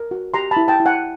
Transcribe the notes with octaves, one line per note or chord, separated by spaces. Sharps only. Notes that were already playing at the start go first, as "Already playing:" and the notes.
Already playing: A#4
F#4
G4 A#5 C6
A5 B5
E4
G5 A5
E4
F#5 G#5